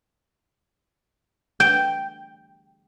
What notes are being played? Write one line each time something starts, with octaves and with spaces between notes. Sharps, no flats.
G5